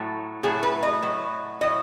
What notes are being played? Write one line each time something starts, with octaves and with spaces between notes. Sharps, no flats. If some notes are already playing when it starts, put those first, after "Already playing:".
Already playing: A2 F#3 A3
A2 F#3 A3 G#4
B4
D#5
A2 F#3
A2 F#3 D#5